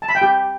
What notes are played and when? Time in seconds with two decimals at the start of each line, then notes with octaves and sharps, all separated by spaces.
0.02 A5
0.09 B5
0.15 G5
0.22 G4